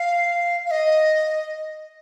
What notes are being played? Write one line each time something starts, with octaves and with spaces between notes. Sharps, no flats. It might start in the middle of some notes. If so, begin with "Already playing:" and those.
Already playing: F5
F5
D#5